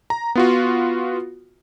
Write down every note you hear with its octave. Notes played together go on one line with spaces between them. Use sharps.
A#5
B3 F4 F#4